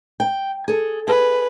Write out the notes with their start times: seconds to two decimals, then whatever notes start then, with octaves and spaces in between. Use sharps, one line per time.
0.20 G5
0.68 G#4 A4
1.08 G#4 B4